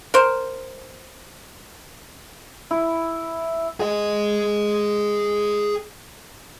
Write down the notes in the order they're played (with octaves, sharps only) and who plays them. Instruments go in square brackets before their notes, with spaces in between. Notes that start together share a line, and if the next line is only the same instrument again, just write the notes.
[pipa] A#4 C5
[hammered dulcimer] E4
[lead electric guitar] G#4 D#5